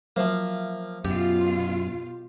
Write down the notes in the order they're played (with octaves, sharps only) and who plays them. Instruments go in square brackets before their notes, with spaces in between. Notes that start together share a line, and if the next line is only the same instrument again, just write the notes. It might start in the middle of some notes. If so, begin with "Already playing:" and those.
[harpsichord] F3 A#3 [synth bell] F#3 C5 E5
[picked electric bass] F#2 [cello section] B2 F4 [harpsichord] G4